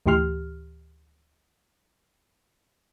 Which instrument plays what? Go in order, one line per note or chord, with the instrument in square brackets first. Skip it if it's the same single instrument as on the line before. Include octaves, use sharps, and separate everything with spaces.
[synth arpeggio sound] D2 A2 E3 G4 C6 F6